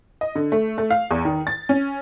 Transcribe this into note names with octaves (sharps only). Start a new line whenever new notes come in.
D#5
D3
A3
A3
F5
E2
D#3
A6
C#4